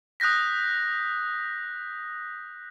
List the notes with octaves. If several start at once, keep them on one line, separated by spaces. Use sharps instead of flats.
D#6 F#6 G6 A#6 B6